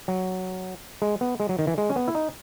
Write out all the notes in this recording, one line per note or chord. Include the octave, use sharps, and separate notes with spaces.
F#3
G#3
B3
G#3
F#3
D#3
E3
G#3
C#4
B3
E4
D#4